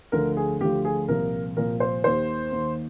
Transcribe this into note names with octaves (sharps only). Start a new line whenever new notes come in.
D2 D3 F3 A#4
G#4
D2 D3 F3 G4
G#4
C2 A#2 F3 A#4
C2 A#2 F3 A#4
C5
D#2 D#3 C5
D#2 D#3